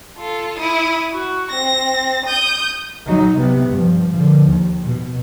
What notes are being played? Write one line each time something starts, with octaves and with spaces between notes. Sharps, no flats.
F4 A4
E4 D#6
F#4
C4 A#6
D#6 G6
F#3 D#4
C3 B3
G2 F3
D3 F3
D#2
B2